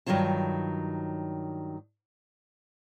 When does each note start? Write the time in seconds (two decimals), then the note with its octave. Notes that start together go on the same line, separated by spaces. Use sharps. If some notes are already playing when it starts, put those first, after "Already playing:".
0.06 G2 D#3 F3 F#3 F4 A5